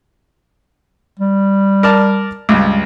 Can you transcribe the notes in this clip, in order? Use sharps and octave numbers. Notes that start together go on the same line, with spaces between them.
G3
A#4 D5 A5
C#2 G2